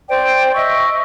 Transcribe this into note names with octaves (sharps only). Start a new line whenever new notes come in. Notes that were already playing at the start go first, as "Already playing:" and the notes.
C5 D5 G5
D#5 E5 C#6 E6